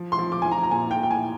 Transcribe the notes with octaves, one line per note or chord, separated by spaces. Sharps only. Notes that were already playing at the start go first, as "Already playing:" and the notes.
Already playing: F3
C6
F3
D6
F3 G#5
A#5
A#5
A#2 G#5
G5
A#2
G5
G#5